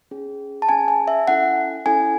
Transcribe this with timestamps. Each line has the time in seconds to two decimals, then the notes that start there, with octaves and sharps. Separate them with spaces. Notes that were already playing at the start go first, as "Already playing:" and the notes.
0.11 C#4 G#4
0.62 A5
0.69 C#4 G#4 G#5
0.88 G#5
1.08 E5
1.28 C#4 E4 A4 F#5
1.86 C#4 E4 A4 G#5